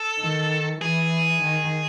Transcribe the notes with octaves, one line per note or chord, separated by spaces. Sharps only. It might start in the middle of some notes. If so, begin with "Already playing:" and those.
Already playing: A4
D#3
E3 G#4
D#3